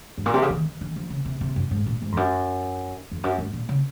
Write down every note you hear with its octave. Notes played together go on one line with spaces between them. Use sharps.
G#2
A#2
C3
C#3
D#3
D#3
D#3
F3
C#3
C3
C3
F#2
G#2
A#2
G#2
F2
F#2
F2
F#2
G#2
A#2
C#3